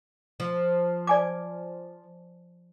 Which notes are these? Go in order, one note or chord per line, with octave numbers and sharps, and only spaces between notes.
F3
D5 G#5 D6